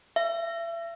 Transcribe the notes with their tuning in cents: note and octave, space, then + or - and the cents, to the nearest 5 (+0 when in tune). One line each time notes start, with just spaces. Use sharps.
E5 +35